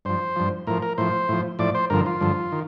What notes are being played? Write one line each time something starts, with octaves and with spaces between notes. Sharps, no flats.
G2 F3 C5
G2 F3
A2 F3 A#4
A#4
A2 F3 C5
A2 F3
A2 F3 D5
C5
G2 D3 F3 A#4
F4
G2 D3 F3
D#3